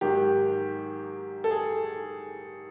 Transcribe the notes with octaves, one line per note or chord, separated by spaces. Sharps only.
G#2 D#3 F#3 G4
A4
G#4